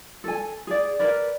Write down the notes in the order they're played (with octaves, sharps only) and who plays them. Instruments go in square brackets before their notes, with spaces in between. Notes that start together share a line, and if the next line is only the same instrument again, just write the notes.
[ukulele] A4 G#5
G#4 D5
A#4 B4 D5